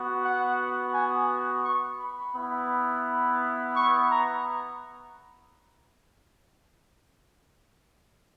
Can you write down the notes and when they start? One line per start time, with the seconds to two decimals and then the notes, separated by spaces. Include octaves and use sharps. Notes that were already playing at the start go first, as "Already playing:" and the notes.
Already playing: B3 F#4
0.22 F#5
0.93 G#5
1.63 C#6
1.99 B5
2.35 B3 E4
3.75 C#6
4.11 A#5